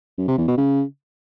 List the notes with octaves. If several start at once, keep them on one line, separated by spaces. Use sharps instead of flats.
F#2
C3
E2
B2
C#3